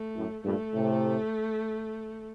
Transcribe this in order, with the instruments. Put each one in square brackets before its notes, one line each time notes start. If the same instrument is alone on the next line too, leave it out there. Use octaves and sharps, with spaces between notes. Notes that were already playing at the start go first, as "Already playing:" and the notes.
Already playing: [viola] A3
[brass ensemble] F#2 A2
[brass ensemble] G2 A#2 [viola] A3
[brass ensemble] A2 C3